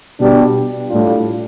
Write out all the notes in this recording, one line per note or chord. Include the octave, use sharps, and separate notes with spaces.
B2 G3 D4 G4
A2 G3 D4 F4